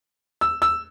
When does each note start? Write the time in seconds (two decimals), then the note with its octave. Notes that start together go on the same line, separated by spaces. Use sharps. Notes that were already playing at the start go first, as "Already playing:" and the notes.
0.41 E6
0.62 E6